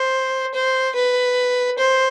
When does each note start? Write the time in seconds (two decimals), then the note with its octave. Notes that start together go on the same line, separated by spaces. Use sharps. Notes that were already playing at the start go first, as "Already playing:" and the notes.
Already playing: C5
0.54 C5
0.95 B4
1.79 C5